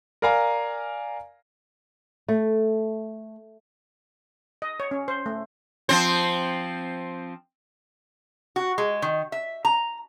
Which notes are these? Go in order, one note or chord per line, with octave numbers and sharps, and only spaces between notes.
A#4 D5 F5 G#5 A#5
A3
D#5
C#5
C#4
C5
A3
F3 C4 C5
F#4
G#3
D#3
E5
A#5